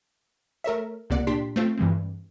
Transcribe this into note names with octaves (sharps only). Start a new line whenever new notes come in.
A3 A#4 C#5 E5
C#2 C3 A#3 D5 F#5 C#7
A#2 D4 G4 C6 B6
A3 C4 F4
G2 E3 G#3 C4